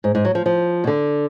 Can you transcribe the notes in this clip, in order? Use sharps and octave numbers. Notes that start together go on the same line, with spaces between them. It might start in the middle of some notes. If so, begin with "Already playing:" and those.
G#2
G#2
F#3
F3
F3
B2
D3